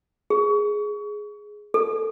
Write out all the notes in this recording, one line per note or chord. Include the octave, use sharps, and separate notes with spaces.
G#4
A4